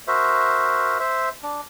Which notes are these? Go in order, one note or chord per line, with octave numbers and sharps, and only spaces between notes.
F#4 A#4 C5 E5
C5 E5
D4